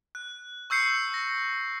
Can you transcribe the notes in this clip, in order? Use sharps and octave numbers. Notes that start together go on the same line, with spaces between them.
F#6
C#6 E6 G6 C7 C#7
A#6